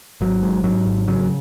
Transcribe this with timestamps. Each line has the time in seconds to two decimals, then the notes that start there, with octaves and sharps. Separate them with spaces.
0.21 G#1 F#3
0.42 G#2
0.64 G#2 F#3
0.86 G#1
1.07 C#3 F#3